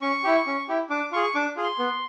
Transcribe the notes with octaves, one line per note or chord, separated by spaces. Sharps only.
C#4 C#6
E4 G4
C#4
E4 G4
D4 D6
F4 G#4 C#6
C#6
D4 D6
F4 G#4
C6
B3